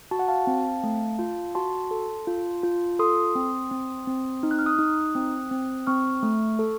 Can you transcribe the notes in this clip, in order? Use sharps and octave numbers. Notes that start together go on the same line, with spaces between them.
F#4 A5
F#5
F5 A5
C4
A3
F4
F#4 A5 C6
A4
F4
F4
A4 C6 D#6
C4
C4
C4
D#4
F#6
F6
D#6 F#6
D#4
C4
C4
C4 C#6 F6
A3
A4